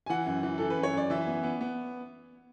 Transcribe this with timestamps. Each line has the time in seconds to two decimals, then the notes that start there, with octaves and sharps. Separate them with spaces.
0.06 G#5
0.09 E3 F#5
0.26 F#2
0.43 E3
0.58 E3 A4
0.70 B4
0.77 F#2
0.83 C#5
0.93 F#2 D5
1.10 E3 E5
1.27 B3
1.43 B3
1.61 B3